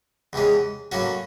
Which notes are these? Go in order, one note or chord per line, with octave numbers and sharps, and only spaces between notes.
E2 C3 E3 G#3 C#4
A2 F#3 A#3 C#4 F#4